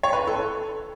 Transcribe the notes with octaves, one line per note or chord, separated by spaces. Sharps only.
C#5
B4
A4